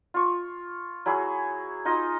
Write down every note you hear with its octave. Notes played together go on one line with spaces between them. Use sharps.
F4 C#6
F#3 E4 G#4
D#4 F4 D#5